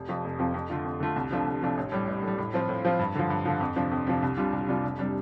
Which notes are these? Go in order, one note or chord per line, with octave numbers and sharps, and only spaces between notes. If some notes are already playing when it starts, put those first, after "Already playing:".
Already playing: F1
F2 C3 F3
F1
F2 C3 F3
F2
D3 A3 F4
F2
D3 A3 F4
C2
C3 F3 A3 D4
C2
C3 F3 A3 D4
A1
A2 G3
A1
A2 G3
A2
F3 C4 F4
A2
F3 C4 F4
G2
D3 F3
G2
D3 F3
F2
C3 F3 D4
F2
C3 F3 D4
C2
C3 G3 D4 F4
C2
C3 G3 D4 F4
F1
C3 G3 D4